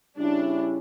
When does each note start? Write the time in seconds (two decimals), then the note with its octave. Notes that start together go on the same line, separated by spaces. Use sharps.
0.17 C#3 G3 C#4 D4 E4